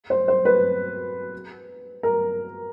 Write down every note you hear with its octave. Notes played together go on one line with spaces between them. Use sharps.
C5
C5
B4
A#4